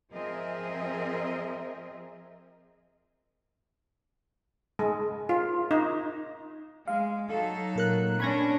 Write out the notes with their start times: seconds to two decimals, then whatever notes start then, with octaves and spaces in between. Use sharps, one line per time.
0.12 F3 C4 G#4 A#4 D#5 E5
4.79 G#3
5.29 F4
5.71 D#4
6.88 G#3 F5
7.29 F#3 D#4 A4
7.76 A#2 A#4 F#6
8.20 C#4 D4 B5 G#6 A#6